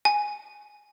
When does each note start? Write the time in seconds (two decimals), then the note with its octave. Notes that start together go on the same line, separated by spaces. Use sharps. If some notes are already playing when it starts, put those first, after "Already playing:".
0.05 G#5